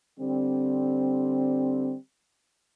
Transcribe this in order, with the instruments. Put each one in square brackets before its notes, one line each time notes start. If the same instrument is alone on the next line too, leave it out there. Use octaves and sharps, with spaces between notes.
[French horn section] D3 G3 C4